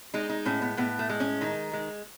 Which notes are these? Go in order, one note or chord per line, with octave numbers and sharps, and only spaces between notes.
G#3 D#4
D#4
A2 C#4
B3
A2 B3
A3
G#3
C#4
D#3 D#4
G#3